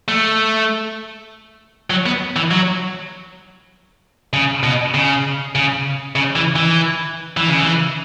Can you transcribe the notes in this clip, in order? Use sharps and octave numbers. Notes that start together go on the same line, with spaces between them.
A3
F#3
B3
E3
F#3
C#3
B2
C#3
C#3
C#3
E3
E3
E3
C#3
E3